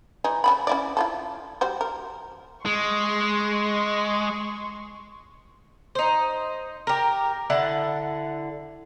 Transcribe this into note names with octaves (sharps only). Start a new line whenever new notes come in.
E3 G#3 D#4
C#3 E3 B5
C#4 E4 D5
E4 F4 A4
G3 F#4 C5
A#4
G#3 C6 C#6
D#4 C5
G4 A#4
D3 E4 F#5 A5